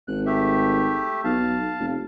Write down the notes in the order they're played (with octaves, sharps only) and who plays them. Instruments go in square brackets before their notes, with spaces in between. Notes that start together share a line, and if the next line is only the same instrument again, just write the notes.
[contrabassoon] G#1 [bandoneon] F#6
[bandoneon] A3 G4 E5
[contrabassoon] B1 [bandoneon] F5 A5
[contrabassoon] F1